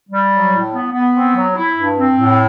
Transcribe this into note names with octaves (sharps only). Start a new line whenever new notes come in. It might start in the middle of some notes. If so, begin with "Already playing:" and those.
G3
F#3
A2
B3
B3
C4
F#3
E4
G2
C4
A2